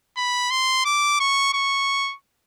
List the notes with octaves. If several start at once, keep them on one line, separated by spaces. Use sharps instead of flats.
B5
C6
D6
C#6
C#6